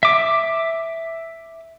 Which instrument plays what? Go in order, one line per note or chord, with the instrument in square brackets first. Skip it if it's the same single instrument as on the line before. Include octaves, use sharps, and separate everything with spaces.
[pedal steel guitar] E5 D6